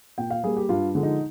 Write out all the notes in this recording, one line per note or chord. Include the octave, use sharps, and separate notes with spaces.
A#2 G5
F5
G3 A#3 G#4
G4
G2 F4
D3 F3 G#3
D#4